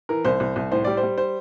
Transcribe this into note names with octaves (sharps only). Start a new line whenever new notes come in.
E3 A#4
C2 C5
C2
C2
A2 C5
G3 D5
C5
G3
C5